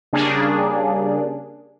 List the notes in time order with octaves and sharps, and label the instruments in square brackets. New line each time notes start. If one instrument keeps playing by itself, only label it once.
[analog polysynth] C#3 G3 A#3 D4 G#4